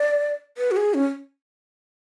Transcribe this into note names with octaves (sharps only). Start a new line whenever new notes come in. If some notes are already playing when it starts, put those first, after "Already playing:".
Already playing: D5
B4
F#4
G#4
C#4